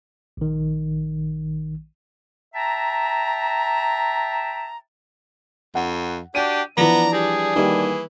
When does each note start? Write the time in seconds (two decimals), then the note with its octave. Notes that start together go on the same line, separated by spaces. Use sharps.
0.37 A#1 D#3
2.54 E5 G5 A5 A#5
5.75 F2 F#5
6.35 D4 F#4 G4 G5 D#7
6.78 E3 F3 B3 D4 D5 A#5
7.13 G3 G#4
7.56 D#3 E3 G3 A#3